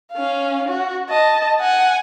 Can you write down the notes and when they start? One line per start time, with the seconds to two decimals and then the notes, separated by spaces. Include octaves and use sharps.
0.13 C#4 F5
0.69 F#4
1.10 D#5 A5
1.61 F#5 G#5